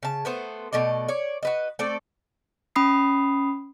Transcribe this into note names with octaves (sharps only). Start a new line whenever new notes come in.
C#3 A5
A3 B3 C5
B2 A3 D5 D#5
C#5 D5
F#4 B4 D#5
A3 C4 A4 D5
C#4 B5 D#6 C7